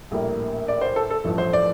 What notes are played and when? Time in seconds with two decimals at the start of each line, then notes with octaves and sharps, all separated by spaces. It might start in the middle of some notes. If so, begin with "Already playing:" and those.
0.11 A#1 A2 G3 A#3
0.68 D5
0.81 C5
0.96 A4
1.10 A4
1.24 A1 G2 F3 A3
1.38 C5
1.53 D5